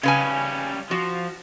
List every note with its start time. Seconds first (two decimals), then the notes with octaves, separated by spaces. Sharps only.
0.03 C#3 G3 C#4 B4 G#5
0.91 F3 F#4